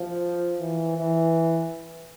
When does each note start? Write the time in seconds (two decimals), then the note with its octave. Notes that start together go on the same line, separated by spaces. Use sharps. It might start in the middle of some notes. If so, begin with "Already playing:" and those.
Already playing: F3
0.60 E3
0.97 E3